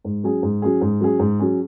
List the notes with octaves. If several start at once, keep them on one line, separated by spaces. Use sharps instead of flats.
G#2
F#3 C#4 G#4
G#2
F#3 C#4 G#4
G#2
F#3 C#4 G#4
G#2
F#3 C#4 G#4